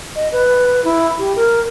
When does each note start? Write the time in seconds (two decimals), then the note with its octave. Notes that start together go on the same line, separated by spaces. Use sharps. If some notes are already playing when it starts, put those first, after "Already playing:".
0.16 D#5
0.32 B4
0.84 E4
1.19 G4
1.36 A#4